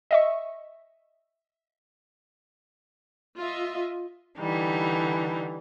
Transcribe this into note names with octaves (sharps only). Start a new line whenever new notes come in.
D#5 E5 C#6
F4 D#5 E5
D3 E3 G3 D#4